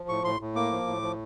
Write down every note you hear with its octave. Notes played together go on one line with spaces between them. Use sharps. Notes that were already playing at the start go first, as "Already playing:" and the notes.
Already playing: F3
A2 C#6
A2 C6
A2
A#3 D6
F3
A2
F3